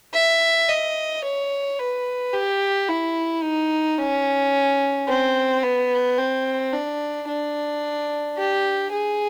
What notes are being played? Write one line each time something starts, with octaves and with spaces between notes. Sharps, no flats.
E5
D#5
C#5
B4
G4
E4
D#4
C#4
C4
B3
C4
D4
D4
G4
G#4